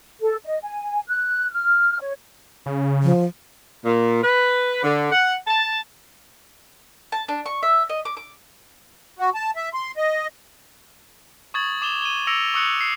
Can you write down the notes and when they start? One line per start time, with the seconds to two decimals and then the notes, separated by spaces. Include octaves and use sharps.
0.21 A4
0.45 D#5
0.63 G#5
1.08 F#6
1.52 F6
2.00 C#5
2.66 C#3
3.03 F3
3.85 A#2
4.23 B4
4.83 D3
5.12 F#5
5.48 A5
7.12 A5
7.28 D4
7.46 C#6
7.63 E5
7.89 D#5
8.05 D6
8.17 D6
9.19 F#4
9.35 A5
9.56 E5
9.74 C6
9.97 D#5
11.54 C#6 D#6 G#6 A6 F#7
11.82 D6 E7 F7 G7
12.02 D#7 F#7 G7
12.27 E6 A#6 C#7 D7 F7
12.54 C#6 D#6 E6 F#6 C#7
12.81 C7